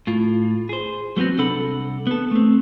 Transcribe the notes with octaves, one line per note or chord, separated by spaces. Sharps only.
A2 F4
G#4 C5
F#3 A3 B3 C4 F#4
C2 D4 A4 F#5 B5
B3 A4
A3 C4